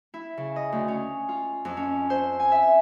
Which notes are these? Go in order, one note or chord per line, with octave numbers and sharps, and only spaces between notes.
E4
C#3
D#5
D2
C#4
F4
F2
C#4
C5
G#5
E5